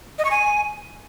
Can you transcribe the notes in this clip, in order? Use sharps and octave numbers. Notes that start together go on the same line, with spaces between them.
D#5
C#6
G#5